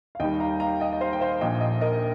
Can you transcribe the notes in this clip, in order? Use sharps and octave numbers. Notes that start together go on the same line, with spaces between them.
F5
D#2 D#3 G3 D#5 G5
F5 A#5
F5 A#5
D#5 G5
D#5
C5 F5
G5
C5 F5
A#1 A#2 F3 D#5 G5
D#5 G5
A#4 D#5